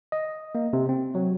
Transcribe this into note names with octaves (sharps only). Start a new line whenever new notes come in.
D#5
A#3
C3
C4
F#3